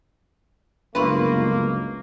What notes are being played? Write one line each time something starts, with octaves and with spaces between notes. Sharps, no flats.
G1 C#2 F#2 A3 A#3 F4 B4